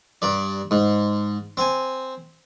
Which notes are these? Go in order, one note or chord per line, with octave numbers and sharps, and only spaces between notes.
G2 D5
G#2
C4 G#5